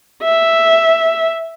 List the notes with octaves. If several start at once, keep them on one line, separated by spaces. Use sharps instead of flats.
E5